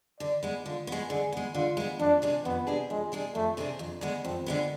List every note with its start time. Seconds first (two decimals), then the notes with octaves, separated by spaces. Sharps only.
0.20 D3 D5
0.43 G#3 B3
0.66 D3 F4
0.87 G#3 B3
1.10 D3 G#4
1.32 G#3 B3
1.55 D3 F4
1.77 G#3 B3
1.99 F2 D4
2.22 C3 G#3 D4 G#4
2.45 F2 B3
2.67 C3 G#3 D4 G#4
2.90 F2 G#3
3.12 C3 G#3 D4 G#4
3.35 F2 A3
3.57 C3 G#3 D4 G#4
3.79 F2
4.01 D3 G#3 B3
4.24 F2 C4
4.46 D3 G#3 B3